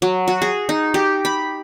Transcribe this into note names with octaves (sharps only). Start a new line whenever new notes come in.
F#3
F#4
G#4
D#4
G4
B5